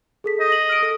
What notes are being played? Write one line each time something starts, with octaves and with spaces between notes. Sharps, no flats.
G#4 A4 B6
D#5
F#7
F6 D7
A4